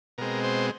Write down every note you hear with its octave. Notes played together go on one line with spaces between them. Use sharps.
B2 G#3 C4 A#4
C5